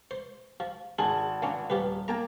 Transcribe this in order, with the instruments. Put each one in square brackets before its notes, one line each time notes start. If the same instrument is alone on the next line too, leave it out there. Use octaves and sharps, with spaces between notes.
[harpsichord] C5
F3
[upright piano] G#1 A5 F#7 [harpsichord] G#4
[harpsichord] A#3 C#4 D4
[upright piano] D#1 [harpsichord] F3 G4 B4
[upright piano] A#3 [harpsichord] G5 A5 A#5